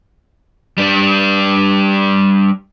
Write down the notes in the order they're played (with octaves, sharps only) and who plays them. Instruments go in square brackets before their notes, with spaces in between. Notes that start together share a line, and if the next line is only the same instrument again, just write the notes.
[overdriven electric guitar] G3 D4